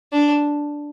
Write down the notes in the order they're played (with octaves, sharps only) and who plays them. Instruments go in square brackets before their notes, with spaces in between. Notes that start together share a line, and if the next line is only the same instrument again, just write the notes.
[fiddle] D4